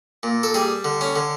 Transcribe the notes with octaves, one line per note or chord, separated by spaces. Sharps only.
A#2
A4
G3 G#4
D3
C#4
D3